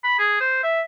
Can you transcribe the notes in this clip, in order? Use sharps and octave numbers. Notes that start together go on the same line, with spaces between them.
B5
G#4
C5
E5